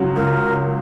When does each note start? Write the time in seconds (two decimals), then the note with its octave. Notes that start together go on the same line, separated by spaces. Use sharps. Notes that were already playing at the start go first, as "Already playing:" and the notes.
Already playing: C#2 C#3 F#3
0.16 C#2 A#4